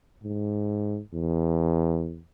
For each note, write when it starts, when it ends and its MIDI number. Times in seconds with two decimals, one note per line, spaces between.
0.24 1.00 44
1.14 2.21 40